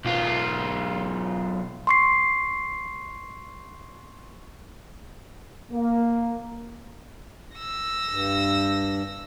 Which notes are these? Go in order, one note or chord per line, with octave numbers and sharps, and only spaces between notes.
B1 F4
C6 C#6 C7
A#3
E6 A#6
G2